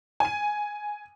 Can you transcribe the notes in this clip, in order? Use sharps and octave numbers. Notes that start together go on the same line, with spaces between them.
G#5 D#7